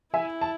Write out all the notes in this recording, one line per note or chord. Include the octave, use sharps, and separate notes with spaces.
E4 E5 G#5
A5